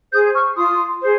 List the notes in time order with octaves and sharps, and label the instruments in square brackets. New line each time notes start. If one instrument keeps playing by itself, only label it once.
[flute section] G#4 C5 D#6 G6
C#6 F6
F4 C6 D#6
G#4 C5